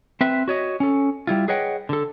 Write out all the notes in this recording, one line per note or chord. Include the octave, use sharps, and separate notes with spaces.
C4 B4 E5
F#4 C#5 D#5
C#4 A4
G3 E4 F4
G#4 B4 C#5 D#5 F#5 G5
D3 A4